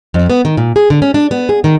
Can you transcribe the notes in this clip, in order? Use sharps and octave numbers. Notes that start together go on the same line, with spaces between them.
F2
B3
D#3
A#2
G#4
D3
C#4
D4
B3
G#4
D#3